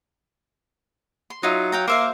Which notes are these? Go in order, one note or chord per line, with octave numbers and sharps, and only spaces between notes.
C6
F#3 D#4 F4 E5
F5 G5 A#5
A#3 C5 E5 F5